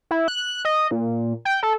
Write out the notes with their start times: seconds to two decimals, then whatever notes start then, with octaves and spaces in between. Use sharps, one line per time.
0.11 E4
0.28 F#6
0.65 D#5
0.91 A#2
1.45 G5
1.63 A4